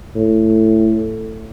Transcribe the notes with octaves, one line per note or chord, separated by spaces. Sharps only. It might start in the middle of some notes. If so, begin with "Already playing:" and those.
A2